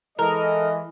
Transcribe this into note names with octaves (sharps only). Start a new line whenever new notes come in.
E3 G#3 A4 A#4 D#5